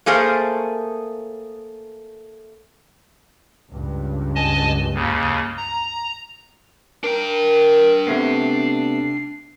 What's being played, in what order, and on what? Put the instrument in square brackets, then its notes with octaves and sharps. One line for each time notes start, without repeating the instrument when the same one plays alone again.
[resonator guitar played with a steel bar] A3 A#3 G#4 A#4 C5
[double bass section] C#2 G2
[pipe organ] D#5 G#5 A5
D#2 C#3
A#5
[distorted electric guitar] D4 G5 [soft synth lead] A#4
[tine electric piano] C3 A3 B3 [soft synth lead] C7